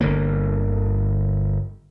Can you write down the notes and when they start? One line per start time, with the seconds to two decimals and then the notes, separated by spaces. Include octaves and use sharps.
0.01 G1 D3 A#3